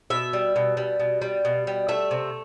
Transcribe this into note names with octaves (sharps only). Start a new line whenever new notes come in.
B2 E5
G3
B2
G3
B2
G3
B2
G3
A3 E5
C3